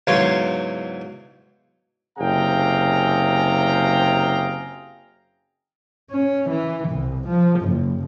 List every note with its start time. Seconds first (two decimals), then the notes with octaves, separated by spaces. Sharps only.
0.07 E2 G#2 C#3 F#3 F5 C6
2.18 F#1 C3 G#4 F5 G5 A#5
6.11 C#4
6.50 E3
6.89 C2
7.28 F3
7.61 F#1